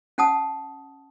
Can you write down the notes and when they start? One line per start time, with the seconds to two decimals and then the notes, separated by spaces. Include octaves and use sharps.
0.18 C#4 F#5 A5 D#6